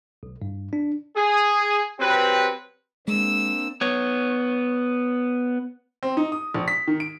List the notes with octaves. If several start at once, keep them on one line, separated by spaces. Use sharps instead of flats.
B1
G2
D4
G#4
F#3 C4 G4 B4
G#3 A#3 C4 D4 E6
B3 C#5
C4
D#4
D#6
A#1
B6
D#3
D7